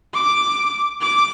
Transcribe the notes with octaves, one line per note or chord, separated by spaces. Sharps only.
D6
D6